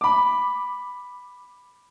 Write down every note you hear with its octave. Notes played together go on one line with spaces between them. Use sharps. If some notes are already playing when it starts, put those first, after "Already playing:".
B5 D6